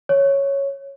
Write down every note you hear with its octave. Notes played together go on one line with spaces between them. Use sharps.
C#5